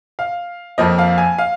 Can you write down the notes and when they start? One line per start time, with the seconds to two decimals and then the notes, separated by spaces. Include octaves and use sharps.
0.19 F5
0.78 F2 F3 A#3 D#5
0.99 F5
1.18 G#5
1.38 F5